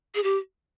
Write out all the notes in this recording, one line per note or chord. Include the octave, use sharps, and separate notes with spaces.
G#4
G4